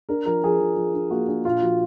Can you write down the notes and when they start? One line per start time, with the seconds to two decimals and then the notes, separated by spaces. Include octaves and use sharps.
0.09 D4 A#4
0.26 F3 A#4
0.43 F3 G#4
0.60 F3
0.76 F3
0.94 D4
1.11 A#3 F#4
1.28 D4 G#4
1.45 A#2 F4
1.62 F3 F#4